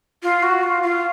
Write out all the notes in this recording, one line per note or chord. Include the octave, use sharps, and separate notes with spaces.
F4
F#4
F4
F4